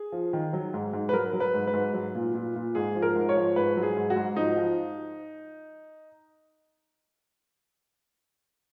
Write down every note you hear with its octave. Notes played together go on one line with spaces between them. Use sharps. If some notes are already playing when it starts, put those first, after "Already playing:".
Already playing: G#4
F3
D#3
F#3
G#2
G#2
B4
F#3 A#4
F#3
B4
G#2
B4
G#2
F#3
A#2
A#2
A#2
G#2 G#4
F3
A#4
G#2
C#5
F3
G#2 B4
F#3
G#4
G#2
F#4
G#2
F3 D#4
F3